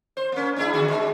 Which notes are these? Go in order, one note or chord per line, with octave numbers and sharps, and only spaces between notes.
C5
A#3 C#4
D4 E4 G#4
D3 F#4
G#3